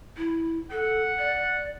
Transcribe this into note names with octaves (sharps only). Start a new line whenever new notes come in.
E4
A4 F#5
D5